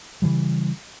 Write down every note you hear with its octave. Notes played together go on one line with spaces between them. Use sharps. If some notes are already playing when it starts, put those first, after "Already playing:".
C#3 E3 G3